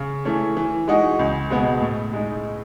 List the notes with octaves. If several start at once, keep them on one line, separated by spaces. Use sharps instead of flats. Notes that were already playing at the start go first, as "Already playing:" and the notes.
Already playing: C#3
E3 A3 C#4
E3
G#3 D#4 F#4
C#2
B2 G#3 B3
A2
G#3 D#4